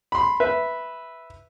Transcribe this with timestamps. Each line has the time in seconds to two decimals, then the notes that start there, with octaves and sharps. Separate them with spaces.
0.12 B5 C6
0.40 B4 E5